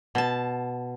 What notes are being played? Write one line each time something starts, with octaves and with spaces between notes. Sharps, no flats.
B2 A5